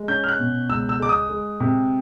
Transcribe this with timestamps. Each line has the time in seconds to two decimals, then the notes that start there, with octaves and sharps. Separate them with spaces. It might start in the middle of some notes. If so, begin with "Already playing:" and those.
Already playing: G#3
0.08 C#4 G6
0.24 F6
0.29 F#6
0.39 B2
0.69 C#2 E6
0.89 E6
0.99 G#3 D6
1.09 D#6
1.30 G#3
1.60 C3